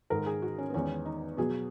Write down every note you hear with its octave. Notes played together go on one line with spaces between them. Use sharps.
G#2 D#3 G#3 A#4
G#4
F#4
C#4
B3
E2 D#3 G#3 C#4
D#4
B2 F#3 G#4